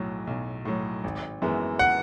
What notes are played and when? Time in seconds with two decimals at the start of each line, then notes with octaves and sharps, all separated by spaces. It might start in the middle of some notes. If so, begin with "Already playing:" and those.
Already playing: B1 A2 F#3
0.27 B1
0.65 A2 F#3
1.04 G#1
1.42 F#2 E3 G#3 B3
1.79 F#5